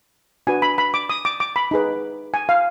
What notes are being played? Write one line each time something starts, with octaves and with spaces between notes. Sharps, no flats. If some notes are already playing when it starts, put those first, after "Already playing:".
D4 F#4 B4 G#5
B5
B5
D6
D#6
D6
D6
B5
D#4 G#4 B4
G#5
F5